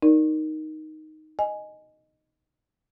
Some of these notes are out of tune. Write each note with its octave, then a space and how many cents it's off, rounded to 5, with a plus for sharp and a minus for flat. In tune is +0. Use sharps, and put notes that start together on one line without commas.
D#4 +0 A#4 +0 D5 +10
D#5 -5 G#5 +5